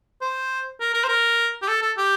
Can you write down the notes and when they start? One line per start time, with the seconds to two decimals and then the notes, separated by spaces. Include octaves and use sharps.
0.21 C5
0.80 A#4
0.94 A#4
1.04 C5
1.08 A#4
1.62 G4
1.68 A4
1.82 A4
1.97 G4